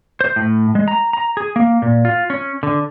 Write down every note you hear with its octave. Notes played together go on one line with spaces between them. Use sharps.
C5
A2
G#3
A#5
A#5
G#4
A#3
A#2
F4
C#4
D3